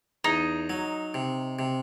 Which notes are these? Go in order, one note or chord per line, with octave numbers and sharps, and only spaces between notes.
E2 D#4
F#3
C3
C3